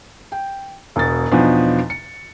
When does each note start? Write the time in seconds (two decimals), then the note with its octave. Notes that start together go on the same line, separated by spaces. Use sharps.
0.32 G5
0.96 E1 B2 A6
1.32 E2 B2 F3 D4 D#4 B4
1.90 C#7